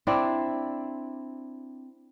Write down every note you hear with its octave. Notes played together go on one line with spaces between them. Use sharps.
C4 D4 E4 D5